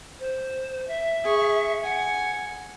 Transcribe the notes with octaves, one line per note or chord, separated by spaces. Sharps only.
C5
E5
G#4 C#6
F#5 G#5